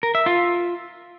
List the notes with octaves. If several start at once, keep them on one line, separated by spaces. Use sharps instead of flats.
A#4
E5
F4